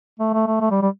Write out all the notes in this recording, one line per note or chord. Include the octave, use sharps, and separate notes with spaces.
A3
A3
A3
A3
G3
G3